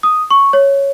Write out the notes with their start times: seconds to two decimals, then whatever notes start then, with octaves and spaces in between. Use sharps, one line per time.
0.03 D#6
0.31 C#6
0.53 C#5